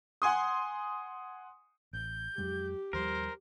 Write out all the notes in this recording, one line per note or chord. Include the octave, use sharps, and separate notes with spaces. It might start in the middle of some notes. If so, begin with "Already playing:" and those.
F#5 G#5 C6 D#6
A1 G6
F2 F#3 G#3 G4
D#2 F3 G3 A#4 C5